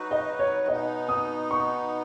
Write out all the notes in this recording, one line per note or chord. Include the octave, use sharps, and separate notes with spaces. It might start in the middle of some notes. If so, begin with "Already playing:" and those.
Already playing: F#3 D#4 F#4 B4
D#5
C#5
B2 B3 D#4 D#5
D#6
C#6